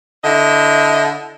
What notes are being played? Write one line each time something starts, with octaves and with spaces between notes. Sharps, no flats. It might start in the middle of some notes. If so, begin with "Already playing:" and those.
D3 E4 D#5